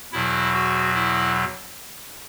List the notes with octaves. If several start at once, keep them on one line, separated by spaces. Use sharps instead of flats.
E2 B2 F#3 E4
F#4
E4